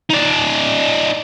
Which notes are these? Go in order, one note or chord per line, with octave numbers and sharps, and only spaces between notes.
D#4 D5